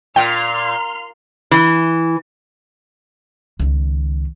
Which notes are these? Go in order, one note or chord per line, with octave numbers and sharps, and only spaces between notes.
A#2 G5 C6 F6
E3
C#2 D#3